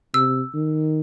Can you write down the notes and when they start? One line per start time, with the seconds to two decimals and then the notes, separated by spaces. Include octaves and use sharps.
0.14 C3 E6
0.54 D#3